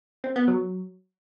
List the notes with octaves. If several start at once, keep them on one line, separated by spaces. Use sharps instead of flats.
C4
B3
F#3